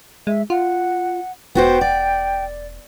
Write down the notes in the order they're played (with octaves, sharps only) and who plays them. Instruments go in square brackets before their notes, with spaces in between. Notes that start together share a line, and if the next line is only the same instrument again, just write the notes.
[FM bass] G#3 [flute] E5
[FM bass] F4 [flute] F#5
[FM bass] E1 [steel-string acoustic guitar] B3 F#4 C5 [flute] G5
[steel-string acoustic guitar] D5